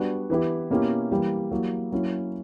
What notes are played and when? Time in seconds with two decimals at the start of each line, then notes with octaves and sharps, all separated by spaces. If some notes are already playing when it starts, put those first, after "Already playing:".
Already playing: G3 B3 D4 F#4
0.30 E3 B3 E4 G4
0.70 B2 A#3 C#4 E4 G4
1.11 E3 G3 A#3
1.51 F#3 A#3 E4 G4
1.92 F#3 A#3 C#4 E4